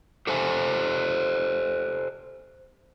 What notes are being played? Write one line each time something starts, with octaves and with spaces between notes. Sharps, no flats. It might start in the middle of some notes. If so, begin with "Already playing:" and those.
G4 A4 C5 E5 G#5